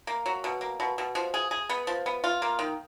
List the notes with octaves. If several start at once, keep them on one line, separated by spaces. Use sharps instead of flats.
A#3
F#3
B2
A#3
B2
B2
F3
G#4
G#4
B3
F3
B3
F4
A#3
D#3